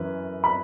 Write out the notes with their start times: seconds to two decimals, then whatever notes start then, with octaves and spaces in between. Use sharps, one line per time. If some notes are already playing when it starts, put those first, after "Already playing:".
Already playing: F#2 E3 C#4 B4
0.44 B5